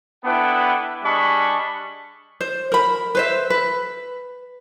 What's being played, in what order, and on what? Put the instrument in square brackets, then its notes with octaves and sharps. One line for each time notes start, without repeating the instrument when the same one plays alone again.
[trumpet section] B3 D4 E4 A4 B4 G5
G3 D4 G#4 D#5 B5 C#6
[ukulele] C5
A#4 B5
B4 C5 E5
B4